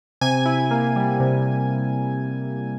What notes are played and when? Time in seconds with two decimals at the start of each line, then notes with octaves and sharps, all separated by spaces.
0.21 C3 G#5
0.46 E4
0.71 A#3
0.96 G3
1.20 C3